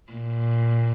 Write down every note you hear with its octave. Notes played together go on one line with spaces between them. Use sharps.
A#2